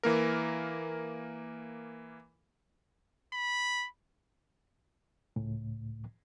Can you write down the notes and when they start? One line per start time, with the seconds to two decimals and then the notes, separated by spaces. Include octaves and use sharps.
0.03 E3 A#3 A#4
3.33 B5
5.36 C#2 A2